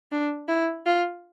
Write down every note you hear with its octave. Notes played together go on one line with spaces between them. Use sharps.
D4
E4
F4